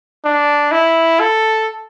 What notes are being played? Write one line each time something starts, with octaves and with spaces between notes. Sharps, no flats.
D4
E4
A4